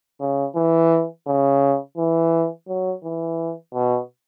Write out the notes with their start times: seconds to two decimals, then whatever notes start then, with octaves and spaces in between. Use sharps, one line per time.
0.21 C#3
0.55 E3
1.27 C#3
1.98 E3
2.68 F#3
3.03 E3
3.74 B2